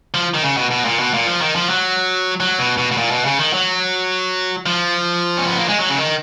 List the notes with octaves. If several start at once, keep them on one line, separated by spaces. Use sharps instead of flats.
F3
D#3
C#3
B2
B2
A#2
B2
A#2
F3
D#3
F3
F#3
F#3
B2
B2
B2
A#2
B2
C#3
D#3
F#3
F3
C#4
B3
A#3
G#3
F#3
C#3
D#3